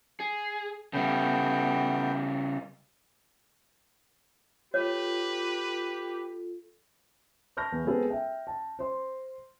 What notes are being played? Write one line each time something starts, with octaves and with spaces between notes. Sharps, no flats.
G#4
C#3 G3 A3 B3 G5
F4 G4 A4 B4 C#5
A5 C#6 F6 G6 A#6
E2
G#3 B3 C4 G#4 A4
E5 G5
A5
C5 C6